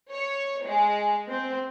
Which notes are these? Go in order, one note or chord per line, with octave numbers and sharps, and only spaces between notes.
C#5
G#3
C4